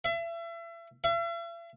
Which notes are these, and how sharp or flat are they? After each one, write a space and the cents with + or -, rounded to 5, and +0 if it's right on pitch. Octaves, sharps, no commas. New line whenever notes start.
E5 +35
E5 +45